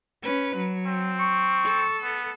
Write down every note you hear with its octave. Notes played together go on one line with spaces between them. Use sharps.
C#4 B4
F#3
C4
C#6
A4
B3